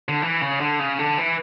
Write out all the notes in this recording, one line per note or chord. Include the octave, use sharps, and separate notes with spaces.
D3
E3
C#3
D3
C#3
D3
E3